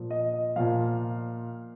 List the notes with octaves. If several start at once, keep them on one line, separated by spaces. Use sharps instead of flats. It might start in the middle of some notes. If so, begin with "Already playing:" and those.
Already playing: A#2 F3
D#5
D#5
A#2 F3 F5